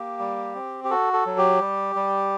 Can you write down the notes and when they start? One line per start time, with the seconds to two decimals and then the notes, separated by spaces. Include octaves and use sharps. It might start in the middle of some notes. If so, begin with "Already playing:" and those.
Already playing: A#3 G4
0.19 G3
0.55 C4
0.84 G4
0.90 F#4 A4
1.13 A4
1.26 F#3
1.38 G4
1.61 G3
1.96 G3